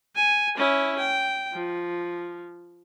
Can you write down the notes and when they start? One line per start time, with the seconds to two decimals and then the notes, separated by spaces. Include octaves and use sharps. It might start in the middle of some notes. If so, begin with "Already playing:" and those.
0.16 G#5
0.58 C#4 E4
0.99 G5
1.53 F3